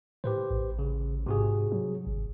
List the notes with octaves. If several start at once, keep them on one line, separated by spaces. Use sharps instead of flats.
A2 G4 B4 C5
A1
C#3
G#2 C3 F#4 G#4
F#3
G#1